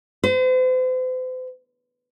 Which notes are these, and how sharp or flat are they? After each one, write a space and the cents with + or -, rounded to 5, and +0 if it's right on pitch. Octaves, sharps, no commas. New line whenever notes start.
C5 -40